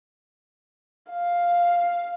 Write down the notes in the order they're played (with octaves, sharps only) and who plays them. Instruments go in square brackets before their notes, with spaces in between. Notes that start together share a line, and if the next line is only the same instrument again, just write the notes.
[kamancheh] F5